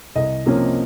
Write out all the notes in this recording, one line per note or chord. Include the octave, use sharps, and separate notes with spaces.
C2 D#5
C3 F3 A#3 C#4